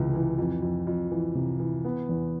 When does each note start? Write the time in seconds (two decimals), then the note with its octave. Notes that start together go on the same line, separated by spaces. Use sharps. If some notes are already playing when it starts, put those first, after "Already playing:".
Already playing: C#2 C3 E3
0.14 E3
0.38 F2
0.62 F2
0.87 F2
1.11 E3
1.35 C3
1.60 E3
1.85 B3
2.09 E2